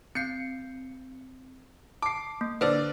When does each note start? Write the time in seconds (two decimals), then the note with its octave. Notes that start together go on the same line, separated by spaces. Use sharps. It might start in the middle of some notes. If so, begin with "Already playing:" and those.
0.15 C4 G6 C7 C#7
2.02 A5 D6 C7
2.41 A#3
2.61 D3 D4 B4 C5 D5